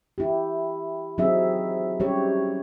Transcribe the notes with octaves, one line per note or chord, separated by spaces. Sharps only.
E4 G4
F#3 C4 D#4 E4 G#4 E5
G3 C#4 G4 C#5